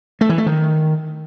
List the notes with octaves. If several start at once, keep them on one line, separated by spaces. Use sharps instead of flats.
A3
E3
A3
D#3